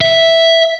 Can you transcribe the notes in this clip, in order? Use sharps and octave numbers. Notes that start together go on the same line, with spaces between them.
E5